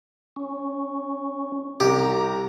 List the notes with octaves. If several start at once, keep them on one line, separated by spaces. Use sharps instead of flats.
C#4
C2 G4 A#5